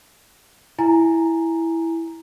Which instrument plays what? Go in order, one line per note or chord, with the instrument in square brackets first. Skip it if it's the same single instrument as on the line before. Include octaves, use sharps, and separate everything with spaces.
[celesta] E4 G#5 A#5